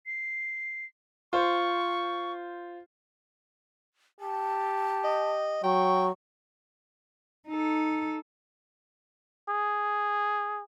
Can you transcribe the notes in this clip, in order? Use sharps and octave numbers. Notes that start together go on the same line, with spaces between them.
C7
F4 C5 C#6
G4 A5
D#5
F#3 G5 C#6
D#4 A4
G#4